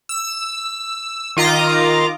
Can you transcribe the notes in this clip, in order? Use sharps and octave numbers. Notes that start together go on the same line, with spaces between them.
E6
D#3 F4 D#5 A#5 D6